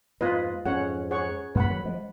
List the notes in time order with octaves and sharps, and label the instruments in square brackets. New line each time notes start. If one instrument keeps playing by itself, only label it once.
[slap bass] F2 G#2 [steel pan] F4 B4 D#5
[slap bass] F2 G#2 [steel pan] C#4 G#4 C#5 F#5
[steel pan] G#4 C#5 F#5 C#6
[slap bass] F#2 A#2 [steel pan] B4 F#5 B5
[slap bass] D#3 F#3
F3 G#3